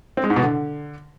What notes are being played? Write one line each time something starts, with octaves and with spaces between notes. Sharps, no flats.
C4
G#3
G#2
B2
D3